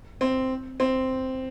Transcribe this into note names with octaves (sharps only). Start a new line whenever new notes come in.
C4
C4